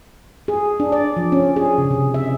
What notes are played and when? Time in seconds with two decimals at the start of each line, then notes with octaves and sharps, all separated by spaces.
0.48 G#4
0.80 D4
0.92 D5
1.17 F3
1.32 C#4
1.56 G#4
1.78 C#3
1.91 C3
2.14 E5